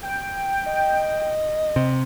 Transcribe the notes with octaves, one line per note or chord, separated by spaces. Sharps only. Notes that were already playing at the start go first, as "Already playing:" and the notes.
G5
D#5
C3